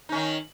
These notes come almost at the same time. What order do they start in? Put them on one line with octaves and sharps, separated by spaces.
D#4 C#4 D#3